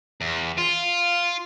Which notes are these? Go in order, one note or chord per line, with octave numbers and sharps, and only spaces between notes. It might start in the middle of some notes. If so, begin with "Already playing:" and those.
E2
F4